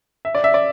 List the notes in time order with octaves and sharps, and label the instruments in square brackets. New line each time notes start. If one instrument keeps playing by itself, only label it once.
[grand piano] E5
D5
E5
D5